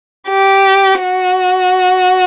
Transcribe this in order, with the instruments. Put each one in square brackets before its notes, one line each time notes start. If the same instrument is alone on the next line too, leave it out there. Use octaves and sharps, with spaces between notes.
[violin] G4
F#4